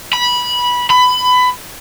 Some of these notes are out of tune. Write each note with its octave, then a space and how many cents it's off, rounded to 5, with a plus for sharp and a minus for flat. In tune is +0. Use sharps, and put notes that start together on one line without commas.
B5 -15
B5 +20